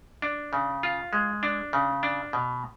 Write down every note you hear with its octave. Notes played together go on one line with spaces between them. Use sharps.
D4
C#3
F4
G#3
D4
C#3
D4
B2